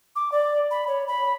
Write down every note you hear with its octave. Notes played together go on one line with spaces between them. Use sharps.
D6
D5
B5
C#5
B5